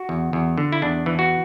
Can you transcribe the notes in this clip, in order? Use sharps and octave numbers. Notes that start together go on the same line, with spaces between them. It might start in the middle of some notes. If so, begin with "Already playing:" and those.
Already playing: F#4
E2
E2
D3
E4
E2 D4
E3
F#4